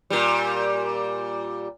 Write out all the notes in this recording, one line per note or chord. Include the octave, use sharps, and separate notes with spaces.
A#2 G3